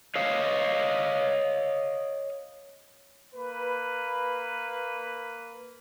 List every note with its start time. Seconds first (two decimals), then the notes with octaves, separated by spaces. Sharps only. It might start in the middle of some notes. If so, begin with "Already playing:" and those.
0.15 C#5 D#5 F5
3.35 A#3 B4